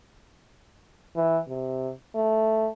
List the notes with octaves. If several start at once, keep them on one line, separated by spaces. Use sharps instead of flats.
E3
C3
A3